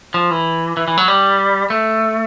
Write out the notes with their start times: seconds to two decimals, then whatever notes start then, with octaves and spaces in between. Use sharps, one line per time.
0.14 F3
0.31 E3
0.77 E3
0.88 E3
0.97 F#3
1.08 G3
1.70 A3